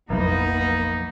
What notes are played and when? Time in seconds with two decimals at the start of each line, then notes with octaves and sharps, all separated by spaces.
0.10 F1 A#1 F3 F#3 A#3 B3 D#4